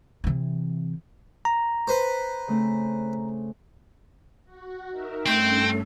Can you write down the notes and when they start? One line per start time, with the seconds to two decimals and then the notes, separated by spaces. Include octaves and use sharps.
0.24 C3 E3
1.45 A#5
1.88 B4 C5
2.48 C#3 A3 C4
4.45 F#4
4.90 D#4 A#4 E5
5.26 G2 A3 C4 C#4 A4 G5